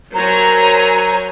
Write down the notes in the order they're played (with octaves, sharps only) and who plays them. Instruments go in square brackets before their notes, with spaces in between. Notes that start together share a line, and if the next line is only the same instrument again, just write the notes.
[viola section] F#3 C5 G#5 [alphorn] A#4 [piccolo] A#5